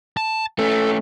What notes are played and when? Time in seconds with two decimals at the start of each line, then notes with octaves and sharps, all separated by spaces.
0.17 A5
0.59 A3 C#4 A4